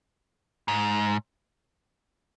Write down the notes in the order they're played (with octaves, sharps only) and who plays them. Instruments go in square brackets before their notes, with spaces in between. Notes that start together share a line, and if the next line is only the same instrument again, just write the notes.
[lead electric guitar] G#2